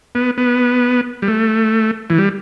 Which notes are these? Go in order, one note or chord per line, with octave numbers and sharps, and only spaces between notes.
B3
B3
G3
A3
E3
G3